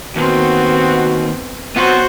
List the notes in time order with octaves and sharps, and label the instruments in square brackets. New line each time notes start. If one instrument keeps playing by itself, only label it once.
[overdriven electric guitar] D#2 [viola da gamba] B3 C4 [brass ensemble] F#4
[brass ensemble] C3 F#3 C4 [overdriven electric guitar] B3 [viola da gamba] F#4 C5